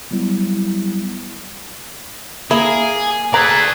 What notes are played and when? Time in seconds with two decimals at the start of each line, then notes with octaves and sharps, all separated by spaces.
0.11 F#3 G3 B3 E4
2.51 A#3 E4 G#4
3.34 G#4 A4 B4 D5 E5 A#5